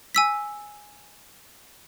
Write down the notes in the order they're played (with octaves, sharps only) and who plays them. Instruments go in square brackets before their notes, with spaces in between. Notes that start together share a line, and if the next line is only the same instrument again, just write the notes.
[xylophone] G#5 E6 B6